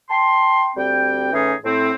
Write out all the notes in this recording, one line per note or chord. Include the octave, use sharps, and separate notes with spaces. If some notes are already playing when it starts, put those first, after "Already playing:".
G5 A5 C6
D2 G3 C4 G5
A2 E3 C#4 D#4 G#4
A2 C4